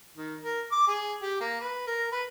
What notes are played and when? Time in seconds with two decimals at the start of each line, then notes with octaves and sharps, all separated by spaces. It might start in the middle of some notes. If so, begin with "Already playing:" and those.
0.15 D#3
0.43 A#4
0.72 D6
0.87 G#4
1.22 G4
1.41 A#3
1.61 B4
1.87 A#4
2.12 B4